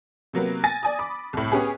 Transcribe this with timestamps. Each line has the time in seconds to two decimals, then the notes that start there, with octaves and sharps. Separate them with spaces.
0.33 C3 F#3 A#3 B3
0.64 G#5 A6 A#6
0.83 D5 G#5 D#6
0.99 B5 D6
1.33 C2 A2
1.52 B3 C#4 G4 G#4